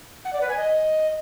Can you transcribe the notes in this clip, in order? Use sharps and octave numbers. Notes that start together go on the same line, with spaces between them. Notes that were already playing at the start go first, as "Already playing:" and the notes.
F#5
D5
B4
G#5
D#5